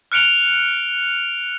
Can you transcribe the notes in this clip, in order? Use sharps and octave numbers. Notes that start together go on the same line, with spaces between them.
F6 F#6 C#7 D7 F7 G7